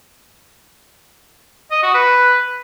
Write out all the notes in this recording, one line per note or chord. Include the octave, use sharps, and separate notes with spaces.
D#5
F#4
B4